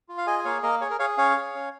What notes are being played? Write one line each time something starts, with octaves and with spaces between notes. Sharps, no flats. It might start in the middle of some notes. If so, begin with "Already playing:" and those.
F4
F5
G#4 D#5 G#5
G#5
A#3 C#5 F5
A#3 A#4 D#5
G#4 C#5
A#4
G#4 C#5 F5
C#4 C#5 F5
G#4
C#4